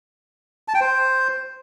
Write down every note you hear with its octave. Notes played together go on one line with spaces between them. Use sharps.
A5
G5
C5